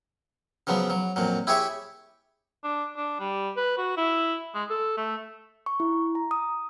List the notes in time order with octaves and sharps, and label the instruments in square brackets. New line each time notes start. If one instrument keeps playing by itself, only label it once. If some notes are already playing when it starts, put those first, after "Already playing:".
[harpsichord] C#3 F3 F#3 B3
F#3
F2 A#2 F#3
E4 G4 G#4 C#5 E5
[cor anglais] D4
D4
G3
B4
F#4
E4
G#3
A4
A3
[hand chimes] C#6
E4
A#5
D#6